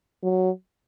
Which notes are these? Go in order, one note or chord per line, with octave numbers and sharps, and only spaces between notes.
F#3